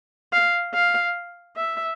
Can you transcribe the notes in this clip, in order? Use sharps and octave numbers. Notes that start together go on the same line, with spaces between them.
F5
F5
E5